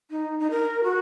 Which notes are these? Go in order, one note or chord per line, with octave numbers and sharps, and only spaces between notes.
D#4
D#4
A#4
F#4